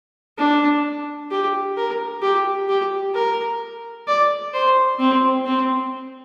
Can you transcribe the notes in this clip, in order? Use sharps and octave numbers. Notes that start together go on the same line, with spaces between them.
D4
G4
A#4
G4
G4
A#4
D5
C5
C4
C4